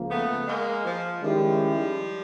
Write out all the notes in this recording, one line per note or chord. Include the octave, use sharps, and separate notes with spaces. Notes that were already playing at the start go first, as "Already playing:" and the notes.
Already playing: C#2 F3 A#3
A3 B3
G#3 A#3
F3
D#3 F3 G3 G#3 C#4 E4 G4